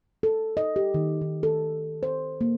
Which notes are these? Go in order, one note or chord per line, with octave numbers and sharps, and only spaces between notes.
A4
D#5
G4
D#3
D#3
A4
C5
A#3